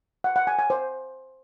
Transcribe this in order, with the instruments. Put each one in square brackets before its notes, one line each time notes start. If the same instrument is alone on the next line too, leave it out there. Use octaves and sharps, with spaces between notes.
[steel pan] F#5
F#5
G#5
G#5
C5